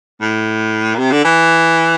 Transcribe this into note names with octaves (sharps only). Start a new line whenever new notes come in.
A2
A#2
C3
D3
E3